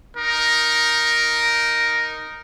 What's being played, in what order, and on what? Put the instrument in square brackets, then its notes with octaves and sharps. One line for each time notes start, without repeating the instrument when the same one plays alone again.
[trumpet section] D#4 A#4